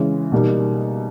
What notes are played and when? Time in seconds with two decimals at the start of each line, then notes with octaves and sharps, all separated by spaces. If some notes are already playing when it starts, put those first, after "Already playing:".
Already playing: C#3 E3 G#3
0.32 B2 G3 A#3 D#4